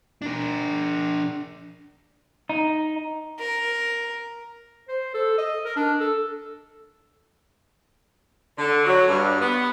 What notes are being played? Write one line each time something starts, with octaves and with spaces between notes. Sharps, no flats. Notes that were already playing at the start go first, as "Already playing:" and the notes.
D4 A#4
D#4
A#4
C5
A4
D#5
A#4
D4
A4
D3
F#3
G2
B3